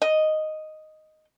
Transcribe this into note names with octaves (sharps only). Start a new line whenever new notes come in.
D#5